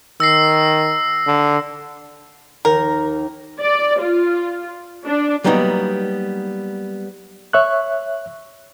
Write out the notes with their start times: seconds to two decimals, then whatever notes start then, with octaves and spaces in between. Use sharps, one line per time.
0.20 D#3 E6 A#6 C7
1.26 D3
2.65 D#2 A#4
3.60 D5
4.00 F4
5.05 D4
5.44 F#3 G3 A#3 B3 C#4 D#4
7.53 C#5 E5 C#6 F#6